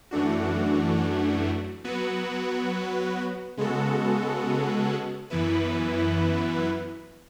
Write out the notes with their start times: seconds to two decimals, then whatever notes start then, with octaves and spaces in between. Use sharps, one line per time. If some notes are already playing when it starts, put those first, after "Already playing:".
0.11 F#2 E3 A3 D4 F#4
1.84 F#3 B3 F#4 B4
3.57 C#3 G#3 B3 F#4 A4
5.30 F#2 E3 B3 E4 B4